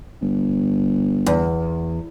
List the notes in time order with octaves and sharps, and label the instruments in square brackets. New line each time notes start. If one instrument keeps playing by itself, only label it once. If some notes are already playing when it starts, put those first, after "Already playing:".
[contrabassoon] G1
[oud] E2